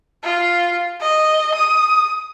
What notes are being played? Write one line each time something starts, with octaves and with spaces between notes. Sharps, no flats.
F4
D#5
D#6